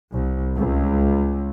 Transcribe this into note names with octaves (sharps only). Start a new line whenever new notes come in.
C2
C#2